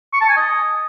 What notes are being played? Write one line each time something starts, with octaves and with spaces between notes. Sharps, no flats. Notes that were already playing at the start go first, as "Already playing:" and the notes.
C#6
A5
G#5
D#5